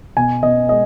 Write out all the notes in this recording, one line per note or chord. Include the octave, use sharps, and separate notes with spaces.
B2 G#5
B2 D#5
G#3 D#5